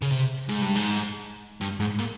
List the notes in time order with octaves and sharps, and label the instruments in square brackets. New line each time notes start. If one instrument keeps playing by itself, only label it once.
[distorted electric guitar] C#3
C3
G#2
G2
G#2
G2
G#2
A#2